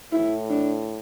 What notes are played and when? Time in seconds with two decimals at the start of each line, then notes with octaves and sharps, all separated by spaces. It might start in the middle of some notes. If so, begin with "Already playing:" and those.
0.12 A2 E4
0.50 D4